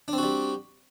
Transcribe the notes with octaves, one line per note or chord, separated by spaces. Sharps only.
G3 C4 D4 F#4